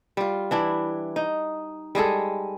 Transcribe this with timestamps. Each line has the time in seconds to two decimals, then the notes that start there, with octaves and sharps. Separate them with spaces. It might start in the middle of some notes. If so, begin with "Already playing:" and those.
0.17 G3 F4
0.51 E3 D4 E4
1.16 D#4
1.95 G3 G#3 G#4 A4